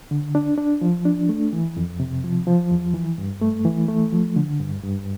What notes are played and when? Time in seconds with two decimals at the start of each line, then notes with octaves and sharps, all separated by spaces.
0.11 D3
0.35 D4
0.58 D4
0.81 F3
1.05 D4
1.29 A3
1.53 E3
1.77 F2
2.00 C3
2.24 F3
2.47 F3
2.71 E2
2.94 E3
3.18 G2
3.41 A3
3.65 E3
3.88 A3
4.12 F3
4.36 D3
4.60 G2
4.83 G2